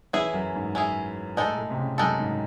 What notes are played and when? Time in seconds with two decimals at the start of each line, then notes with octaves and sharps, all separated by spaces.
0.13 E3 C#4 E4 G#4
0.34 F#2
0.55 G#2
0.75 C#4 E4 G#4
1.37 A2 G#3 D#4 A4
1.57 A2
1.70 C3
1.78 C#3
1.98 F#2 G#3 D#4 A4
2.19 G#2